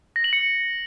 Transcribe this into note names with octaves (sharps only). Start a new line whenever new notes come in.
A#6
F#7
C#7